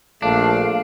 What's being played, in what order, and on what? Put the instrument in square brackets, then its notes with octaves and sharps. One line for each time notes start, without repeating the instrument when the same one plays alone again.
[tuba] A#1 [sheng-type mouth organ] A3 [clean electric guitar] D4 [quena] F5